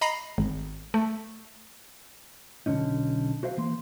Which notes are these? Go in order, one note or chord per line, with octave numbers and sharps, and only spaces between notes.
D#5 A#5 B5 A#6 C7
G#1
A3
B1 G2 D3 C#4 D#4
F#4 C5 E5 F5
E3 A#3 C6